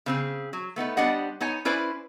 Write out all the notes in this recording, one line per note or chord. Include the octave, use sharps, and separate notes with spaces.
C#3 C4 G#4
F#3
A3 B3 D#4 B4
G3 B3 D4 C5 D#5 F#5
B3 D#4 C#5 G#5
C#4 E4 B4 C5 D5 G#5